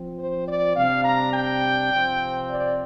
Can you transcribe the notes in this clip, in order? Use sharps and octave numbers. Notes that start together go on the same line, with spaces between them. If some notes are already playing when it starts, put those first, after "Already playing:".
Already playing: F3 C4
C5
D5
C3 G3 D4 F5
A#5
G5
C3 F3 C4
D5